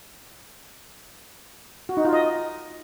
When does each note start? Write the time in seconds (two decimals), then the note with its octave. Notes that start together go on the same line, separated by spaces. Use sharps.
1.89 F#4
1.97 D#4
2.05 F4
2.13 D#5